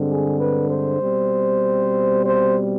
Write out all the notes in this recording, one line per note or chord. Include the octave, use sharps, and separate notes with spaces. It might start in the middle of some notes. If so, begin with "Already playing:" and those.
Already playing: G2 D3 G#3 C4
G#4
B4
C5
B2 G3 C4
C5